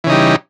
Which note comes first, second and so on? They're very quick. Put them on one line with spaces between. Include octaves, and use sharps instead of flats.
E3 C#3 D#4 G3